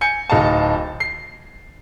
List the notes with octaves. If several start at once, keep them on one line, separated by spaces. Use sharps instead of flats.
G#5 G6 C#7
D1 D#4 F5 A5
C7